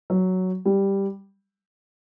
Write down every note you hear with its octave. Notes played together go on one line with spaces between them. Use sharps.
F#3
G3